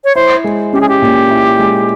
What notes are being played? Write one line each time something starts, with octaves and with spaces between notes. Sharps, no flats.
C#5
E4 C5
G#3
C#4 G4
G#4
G4
A#2
E4
G#3